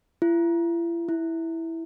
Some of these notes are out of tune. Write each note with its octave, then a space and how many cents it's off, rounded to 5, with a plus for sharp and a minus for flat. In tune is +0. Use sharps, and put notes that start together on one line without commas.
E4 +40
E4 -5